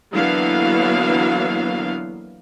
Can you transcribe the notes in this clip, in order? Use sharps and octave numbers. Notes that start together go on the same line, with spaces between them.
D3 E3 F#3 A#3 B3 F5